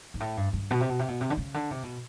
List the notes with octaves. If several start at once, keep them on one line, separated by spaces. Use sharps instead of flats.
G#2
A2
G2
G2
B2
C3
B2
C3
B2
C3
D3
C#3
D3
C3
B2